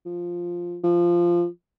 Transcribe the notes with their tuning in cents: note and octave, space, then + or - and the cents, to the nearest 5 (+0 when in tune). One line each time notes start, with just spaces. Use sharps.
F3 +0
F3 -10